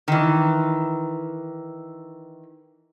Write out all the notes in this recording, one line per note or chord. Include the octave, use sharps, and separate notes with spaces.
D#3 E3